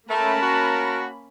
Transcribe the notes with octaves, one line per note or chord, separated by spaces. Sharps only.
A3 A#3 C#4 A#4 A5 B5
F#4